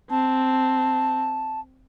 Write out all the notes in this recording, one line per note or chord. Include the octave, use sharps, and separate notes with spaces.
C4 A5